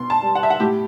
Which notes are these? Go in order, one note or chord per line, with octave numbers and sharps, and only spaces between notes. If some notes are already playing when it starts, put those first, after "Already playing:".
Already playing: B2 C6
A5
G3
F#5
E5
F#5
A2 G4